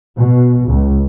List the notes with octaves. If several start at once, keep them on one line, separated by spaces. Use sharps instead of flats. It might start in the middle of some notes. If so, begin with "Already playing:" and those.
B2
C#2